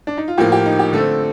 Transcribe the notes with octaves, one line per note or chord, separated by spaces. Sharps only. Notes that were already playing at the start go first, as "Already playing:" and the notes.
D4
D#4
F4
A2 F3 A#3 G4
G4
D#4
G4
D3 A3 C4 A4